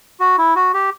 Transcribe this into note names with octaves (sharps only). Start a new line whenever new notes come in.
F#4
E4
F#4
G4